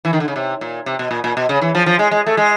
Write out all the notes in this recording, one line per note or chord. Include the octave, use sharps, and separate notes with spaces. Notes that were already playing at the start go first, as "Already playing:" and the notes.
E3
D#3
D3
C#3
C3
A#2
C3
B2
A#2
A#2
B2
C#3
E3
F3
F3
G#3
G#3
A3
G#3